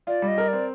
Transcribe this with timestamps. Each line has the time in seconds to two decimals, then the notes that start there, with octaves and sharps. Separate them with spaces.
0.07 F4 D5
0.22 G3
0.28 D#5
0.38 A#4
0.48 D5
0.53 C4